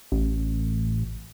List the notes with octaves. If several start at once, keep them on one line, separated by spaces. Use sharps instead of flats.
A1